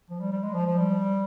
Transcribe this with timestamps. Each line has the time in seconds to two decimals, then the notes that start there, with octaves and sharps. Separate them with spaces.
0.10 F3
0.21 G3
0.32 G3
0.43 G#3
0.55 F3
0.66 F3
0.78 G3